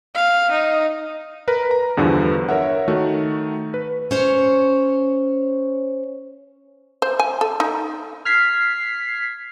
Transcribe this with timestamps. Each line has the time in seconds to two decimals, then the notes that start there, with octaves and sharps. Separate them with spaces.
0.15 F5
0.51 D#4
1.48 A#4 B4 A#5
1.71 A#5
1.97 E2 G2 D3 F3 B3
2.49 A#4 C#5 E5 F#5
2.88 D#3 A3 F#4
3.74 B4
4.11 C#4 C5 C#5
7.02 C5
7.19 G#5
7.41 A4
7.60 D#4
8.25 F6 G#6 B6 C7